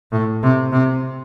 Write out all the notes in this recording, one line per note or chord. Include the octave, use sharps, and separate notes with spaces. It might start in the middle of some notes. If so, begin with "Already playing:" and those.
A2
C3
C3